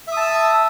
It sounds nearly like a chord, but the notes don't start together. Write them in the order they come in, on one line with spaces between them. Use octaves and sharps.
E5 D#6 A5 E6